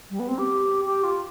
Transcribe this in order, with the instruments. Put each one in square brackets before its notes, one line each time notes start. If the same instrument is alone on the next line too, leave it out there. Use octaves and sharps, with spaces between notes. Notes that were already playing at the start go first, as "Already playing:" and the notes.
[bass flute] G3
B3
C4
G4
G4
F4